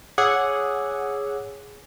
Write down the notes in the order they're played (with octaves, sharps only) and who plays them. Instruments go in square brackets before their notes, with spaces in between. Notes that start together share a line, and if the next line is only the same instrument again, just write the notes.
[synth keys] G#4 F#5 [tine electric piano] C#5 D6 E6